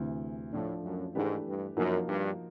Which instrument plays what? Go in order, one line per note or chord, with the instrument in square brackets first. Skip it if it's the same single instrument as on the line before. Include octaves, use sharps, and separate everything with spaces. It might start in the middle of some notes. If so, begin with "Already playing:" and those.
Already playing: [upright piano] D2 C3 E3
[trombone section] A2 [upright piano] F3 A3 D4
[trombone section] F#2
[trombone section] G#2 [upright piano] E3 A3 D4 G4 B4
[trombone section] G2
[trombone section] F#2 [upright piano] F3 A#3 D#4 F#4 A#4
[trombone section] G2